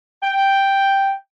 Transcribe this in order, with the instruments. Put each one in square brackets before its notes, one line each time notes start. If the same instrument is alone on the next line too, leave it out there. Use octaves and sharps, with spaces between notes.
[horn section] G5